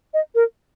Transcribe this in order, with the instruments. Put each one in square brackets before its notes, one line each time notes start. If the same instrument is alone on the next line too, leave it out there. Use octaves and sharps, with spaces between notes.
[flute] D#5
A#4